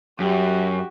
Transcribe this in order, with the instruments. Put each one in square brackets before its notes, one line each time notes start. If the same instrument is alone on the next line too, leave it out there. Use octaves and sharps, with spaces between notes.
[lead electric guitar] F#2 [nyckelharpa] F#4 G4